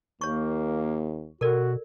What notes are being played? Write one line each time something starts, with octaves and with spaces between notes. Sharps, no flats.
D#2 A#3 C#5 C#6
B2 F#4 A4 A#4 D5